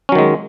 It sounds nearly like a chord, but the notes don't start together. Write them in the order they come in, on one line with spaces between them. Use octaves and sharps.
C#4 F#3 D#3 G#3